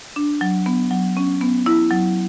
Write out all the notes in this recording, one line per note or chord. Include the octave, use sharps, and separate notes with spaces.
D4
F#3
B3
F#3
C#4
B3
E4
F#3